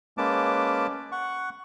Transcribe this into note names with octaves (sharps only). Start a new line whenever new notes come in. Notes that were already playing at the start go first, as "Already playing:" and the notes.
G#3 A#3 C#4 B4 A5 D6
F#5 C#6